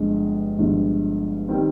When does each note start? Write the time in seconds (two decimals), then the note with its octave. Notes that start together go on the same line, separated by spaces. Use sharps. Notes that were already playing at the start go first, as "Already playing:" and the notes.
Already playing: G1 G2 D3 F3 G#3
0.58 G1 G2 D3 F3 G#3
1.49 D#3 G3 C4